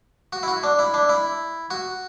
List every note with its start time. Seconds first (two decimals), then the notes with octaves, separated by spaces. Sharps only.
0.33 F#4
0.43 E4
0.48 F#4
0.63 D4
0.79 E4
0.94 D4
1.09 E4
1.70 F#4